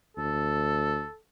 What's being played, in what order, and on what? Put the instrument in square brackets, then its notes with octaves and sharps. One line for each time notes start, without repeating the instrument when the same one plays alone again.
[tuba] D2 [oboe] A4